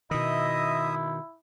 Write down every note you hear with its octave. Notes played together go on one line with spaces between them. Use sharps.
B2 D#3 E4 D#5 E5 D#6